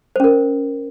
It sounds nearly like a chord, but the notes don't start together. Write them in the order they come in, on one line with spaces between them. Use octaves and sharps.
C5 C#4 A#4